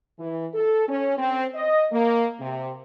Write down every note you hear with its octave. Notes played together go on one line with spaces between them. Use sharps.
E3
A4
C#4
C4
D#5
A#3
C3